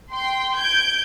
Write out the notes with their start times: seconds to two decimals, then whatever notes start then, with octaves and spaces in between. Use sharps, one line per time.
0.13 G5 C6
0.56 G6 G#6 D7